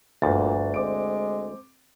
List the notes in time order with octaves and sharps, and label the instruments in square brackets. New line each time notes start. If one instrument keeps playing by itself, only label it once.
[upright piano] G1 A6 [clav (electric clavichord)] D2 [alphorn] A#2
[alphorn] G#3 [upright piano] C4 D6 D7